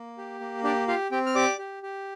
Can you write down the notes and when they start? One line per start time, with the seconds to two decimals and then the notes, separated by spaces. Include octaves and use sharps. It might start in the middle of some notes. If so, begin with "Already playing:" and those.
Already playing: A#3
0.18 G4
0.40 A#3
0.64 D4 G4 D5
0.88 F4 G4 F5
1.11 C4 G4 G5
1.26 F6
1.35 G4 D5 D6
1.58 G4
1.83 G4